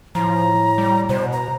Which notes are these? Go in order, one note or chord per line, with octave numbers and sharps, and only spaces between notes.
A2 F3 A#5
G3
B2 C5
A#5